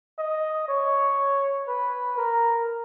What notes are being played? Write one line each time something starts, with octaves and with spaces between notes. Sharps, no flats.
D#5
C#5
B4
A#4